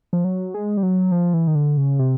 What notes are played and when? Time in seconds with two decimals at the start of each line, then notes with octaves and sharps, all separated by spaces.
0.13 F3
0.24 F#3
0.54 G#3
0.77 G3
0.83 F#3
1.12 F3
1.34 E3
1.47 D#3
1.55 D3
1.77 C#3
1.99 C3